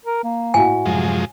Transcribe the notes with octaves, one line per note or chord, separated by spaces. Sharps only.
A#4
A#3
A2 E4 F#4 G#5
F#2 C3 F3 G#3